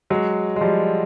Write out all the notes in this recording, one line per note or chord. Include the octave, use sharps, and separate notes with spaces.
F#3 G#3
G#3
F3 G3